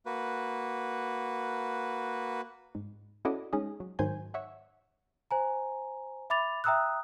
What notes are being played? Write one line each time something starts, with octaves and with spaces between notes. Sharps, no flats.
A#3 F#4 B4
G#2
C#4 E4 F#4 A4 D5 D#5
G#3 C#4 D#4 G#4 D#5
F#3
G#2 D#3 F#3 C5 G#5 G6
C#5 E5 F#5
C5 G#5 A#5
E5 B5 D6 A6 F7
E5 G5 A#5 D#6 E6 F#6